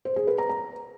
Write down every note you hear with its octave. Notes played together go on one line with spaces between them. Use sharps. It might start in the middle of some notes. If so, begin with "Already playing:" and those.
C5
G#4
B4
A#5
A#5